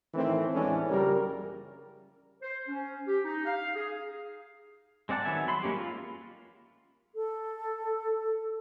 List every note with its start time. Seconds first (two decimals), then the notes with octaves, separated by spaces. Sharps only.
0.14 A2 D#3 E3 A3 C4
0.54 E2 A2 E3 G#3 C#4 D4
0.90 A#1 F#2 C#3 G3 A#4
2.42 C5
2.68 C#4
3.08 G4
3.25 D#4
3.46 F5
3.75 G#4
5.09 G#3 C4 D5 F#5 A5
5.25 D#3 F#3 B3 E5 G#5
5.47 F#3 B5 C6
5.63 G#3 A#3 C#4 G4
5.76 F4
7.15 A4